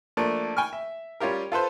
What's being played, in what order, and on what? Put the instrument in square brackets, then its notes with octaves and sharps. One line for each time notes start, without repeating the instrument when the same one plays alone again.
[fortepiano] F3 A3 A#3 D4
G5 G#5 C#6 F6
E5
G3 C#4 F4 G4 A#4
F4 A4 B4 C5